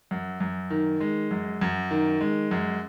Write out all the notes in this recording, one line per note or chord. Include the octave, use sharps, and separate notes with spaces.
F#2
F#2
D#3
G#3
F#2
F#2
D#3
G#3
F#2